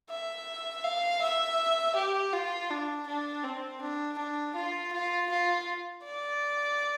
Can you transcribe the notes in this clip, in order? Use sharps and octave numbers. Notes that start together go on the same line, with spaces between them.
E5
F5
E5
G4
F4
D4
D4
C4
D4
D4
F4
F4
F4
D5